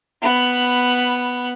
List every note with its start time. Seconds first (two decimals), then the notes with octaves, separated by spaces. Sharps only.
0.22 B3 B5